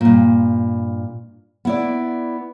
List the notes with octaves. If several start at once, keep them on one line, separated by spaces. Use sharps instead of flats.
G2 A#2
B3 E4 D5